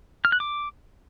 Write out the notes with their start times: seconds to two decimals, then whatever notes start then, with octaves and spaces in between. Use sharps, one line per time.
0.25 F6
0.32 F#6
0.40 D6